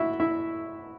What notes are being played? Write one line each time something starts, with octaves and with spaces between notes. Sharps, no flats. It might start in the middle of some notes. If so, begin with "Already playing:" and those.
Already playing: E4 F#4 E5 F#5
E4 E5